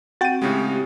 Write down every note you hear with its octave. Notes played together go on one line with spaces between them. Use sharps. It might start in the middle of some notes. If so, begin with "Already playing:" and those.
C4 F#4 G5 A6 D#7
A2 C#3 G#3 G4